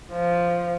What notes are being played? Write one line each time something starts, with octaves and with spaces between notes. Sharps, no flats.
F3